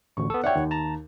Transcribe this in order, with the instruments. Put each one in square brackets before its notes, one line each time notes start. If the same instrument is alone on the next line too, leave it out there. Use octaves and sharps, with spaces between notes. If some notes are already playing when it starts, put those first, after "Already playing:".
[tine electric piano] A1 D2 [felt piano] C#6
[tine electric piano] B3 A4
[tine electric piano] C#5 F#5 [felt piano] D5 E5 G5
[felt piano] D#2
[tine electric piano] A5 A#5